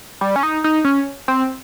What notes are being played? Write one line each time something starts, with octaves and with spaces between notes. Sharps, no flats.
G3
C#4
D#4
D#4
C#4
C4